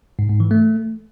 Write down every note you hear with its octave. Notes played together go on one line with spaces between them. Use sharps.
G#2
G#2
E3
A3